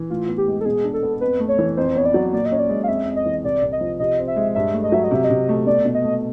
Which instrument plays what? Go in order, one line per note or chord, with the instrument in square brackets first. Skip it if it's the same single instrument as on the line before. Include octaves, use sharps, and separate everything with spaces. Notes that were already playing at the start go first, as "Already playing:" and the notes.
Already playing: [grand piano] E3
[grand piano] A2 [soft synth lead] F4
[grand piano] B3
[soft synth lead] G4
[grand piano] G#3
[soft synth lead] A4
[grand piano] B2 [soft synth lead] G#4
[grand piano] D4
[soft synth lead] A4
[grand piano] B3
[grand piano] F2 [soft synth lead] B4
[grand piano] A3
[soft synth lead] C#5
[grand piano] E3
[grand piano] F2 [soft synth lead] C5
[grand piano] B3 [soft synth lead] C#5
[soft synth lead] D5
[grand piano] F#3
[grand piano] A#2 [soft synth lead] D5
[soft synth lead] D#5
[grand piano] C#4
[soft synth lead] D5
[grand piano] G#3
[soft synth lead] F5
[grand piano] F2 [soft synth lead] E5
[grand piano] F2
[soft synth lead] D#5
[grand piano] E3
[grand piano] C2 [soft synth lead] D5
[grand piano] C2
[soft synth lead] D#5
[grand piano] F3
[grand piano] C3 [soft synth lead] D#5
[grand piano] C4
[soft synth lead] E5
[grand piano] G#3
[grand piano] G2 [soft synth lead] E5
[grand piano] A3
[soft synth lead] D#5
[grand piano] F#3 [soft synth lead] E5
[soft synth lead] D#5
[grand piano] C3 [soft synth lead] E5
[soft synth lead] D#5
[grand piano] C3
A3
[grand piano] B2 [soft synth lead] D5
[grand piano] B2
[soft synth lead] D#5
[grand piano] A3